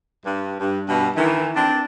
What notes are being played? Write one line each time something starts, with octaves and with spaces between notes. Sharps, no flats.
G2
G2
G2 B2
D#3 E3
C4 D4